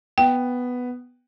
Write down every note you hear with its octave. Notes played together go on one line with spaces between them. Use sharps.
B3 G5